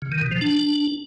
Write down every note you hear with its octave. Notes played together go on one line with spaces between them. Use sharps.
C#3
D#3
B2
F3
D4